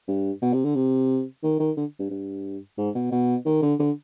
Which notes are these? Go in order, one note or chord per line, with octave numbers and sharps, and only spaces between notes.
G2
B2
C3
D3
C3
D#3
D#3
D3
G2
G2
G#2
B2
B2
D#3
D3
D3